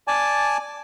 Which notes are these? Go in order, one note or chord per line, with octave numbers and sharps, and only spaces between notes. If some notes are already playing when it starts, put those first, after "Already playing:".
D5 G#5 A5